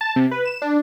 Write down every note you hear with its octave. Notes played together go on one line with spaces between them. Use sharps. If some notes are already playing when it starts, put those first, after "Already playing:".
A5
C3
B4
E7
D4